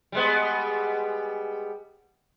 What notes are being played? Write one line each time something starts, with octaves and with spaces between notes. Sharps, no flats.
G3 G#3 B3